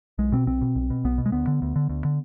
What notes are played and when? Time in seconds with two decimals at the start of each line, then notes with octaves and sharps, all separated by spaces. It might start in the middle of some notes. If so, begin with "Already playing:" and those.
0.18 B1 G#3
0.32 B2 C4
0.47 B1 C4
0.61 B2
0.75 B1
0.90 B2
1.04 B1 B3
1.18 B2
1.26 G#3
1.32 D2 B3
1.47 D3
1.62 D2
1.76 D3
1.89 D2
2.05 D3